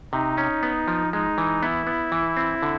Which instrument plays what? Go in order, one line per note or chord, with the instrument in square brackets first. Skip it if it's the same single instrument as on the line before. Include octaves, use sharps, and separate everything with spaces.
[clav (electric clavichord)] C3 [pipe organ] D#4
[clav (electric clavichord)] C#4
B3
F3
[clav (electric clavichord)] G#3 [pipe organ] D#4
[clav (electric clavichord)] E3
[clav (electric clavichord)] B3 [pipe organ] E4
[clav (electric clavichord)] B3
E3
C4
D3